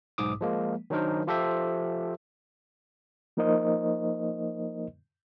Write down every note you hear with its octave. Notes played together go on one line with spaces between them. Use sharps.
B1 G#2 D6 D#6
F3 G#3 A#3
D#3 F#3 D4 D#4 A#4 C5
F3 F4 G4 A4 C5 E5
F3 A#3 D#4 A#4 C5 D#5